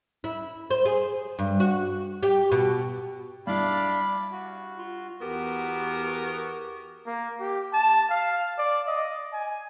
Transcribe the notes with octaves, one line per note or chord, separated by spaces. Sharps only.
E4
C5
G#4
G2
F#4
G4
B2
G2 D4 E4 D5 F5 B5
F#4
F4
E2 B3 F#4 G4 A#4
A#3
G4
A5
F5
D5
D#5
G#5